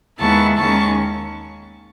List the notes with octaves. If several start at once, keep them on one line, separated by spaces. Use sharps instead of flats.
D#2 D#3 G#3 B3 E4 A5 C#6
D#2 D#3 G#3 C#4 A5 C#6